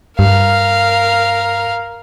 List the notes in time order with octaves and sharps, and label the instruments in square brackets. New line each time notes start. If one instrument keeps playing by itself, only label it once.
[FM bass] G2 [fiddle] A#4 F5